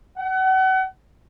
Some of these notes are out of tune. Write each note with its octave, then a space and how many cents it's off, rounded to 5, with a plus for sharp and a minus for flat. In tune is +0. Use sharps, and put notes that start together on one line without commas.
F#5 +35